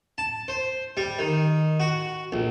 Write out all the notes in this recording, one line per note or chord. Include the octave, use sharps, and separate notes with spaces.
A5
C5
G3
D#3
F#4
A#1